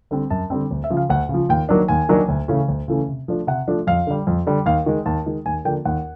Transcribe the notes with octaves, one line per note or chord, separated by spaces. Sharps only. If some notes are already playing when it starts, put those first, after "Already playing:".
D3 G3 C4
F#2 A5
D3 G3 C4
D2
E5
C#3 F3
F5
D2 F#5
C#3 F3
D#2 G5
D#3 F#3 A#3 D4
D#2 G#5
D#3 F#3 A#3 D4
D2
C#3 E3 A3 C#4
D2
C#3 E3 A3 C#4
C3
F3 A3 D4
C3 F#5
F3 A3 D4
F2 F5
D3 G3
F2
D3 G3
D#2 F5
D#3 G#3
D#2 A5
D#3 G#3
D#2 G#5
D3 F3 A#3 D4 G5
D#2 F#5